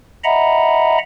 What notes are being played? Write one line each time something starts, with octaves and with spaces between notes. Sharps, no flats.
D#5 E5 F#5 A#5 B5